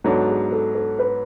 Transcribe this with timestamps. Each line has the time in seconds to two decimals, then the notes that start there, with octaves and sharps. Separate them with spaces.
0.04 G#2 F#3 B3 D4 A4
0.28 G#4
0.52 A4
0.75 A4
0.99 B4